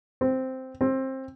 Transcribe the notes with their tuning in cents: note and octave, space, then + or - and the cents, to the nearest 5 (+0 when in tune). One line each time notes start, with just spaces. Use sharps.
C4 -5
C4 +20